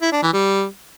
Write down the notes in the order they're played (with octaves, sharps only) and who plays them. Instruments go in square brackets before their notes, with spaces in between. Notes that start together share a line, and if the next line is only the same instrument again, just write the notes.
[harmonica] E4
D4
E3
G3